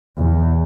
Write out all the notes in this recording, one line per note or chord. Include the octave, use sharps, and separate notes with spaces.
E2